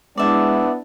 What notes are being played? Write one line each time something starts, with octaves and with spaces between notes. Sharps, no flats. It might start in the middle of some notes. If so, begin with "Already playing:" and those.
G#3 B3 D4 E4 D5 E5